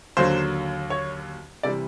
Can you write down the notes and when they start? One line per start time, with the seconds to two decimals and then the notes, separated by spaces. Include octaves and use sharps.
0.17 D#2 D3 F#3 C5
0.90 C#5
1.63 C3 E3 G3 D5